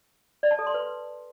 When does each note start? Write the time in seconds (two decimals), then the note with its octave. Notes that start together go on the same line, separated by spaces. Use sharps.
0.43 D5
0.51 A5
0.59 A4
0.67 C6
0.74 B4